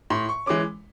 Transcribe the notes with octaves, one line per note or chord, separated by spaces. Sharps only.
A2 C6
C#6
E3 G#3 C#4 D6